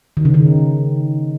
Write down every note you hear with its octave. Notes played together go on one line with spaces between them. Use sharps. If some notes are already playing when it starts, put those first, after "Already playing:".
D#3
C#3
D#3